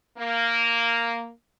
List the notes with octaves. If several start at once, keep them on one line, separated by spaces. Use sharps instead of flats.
A#3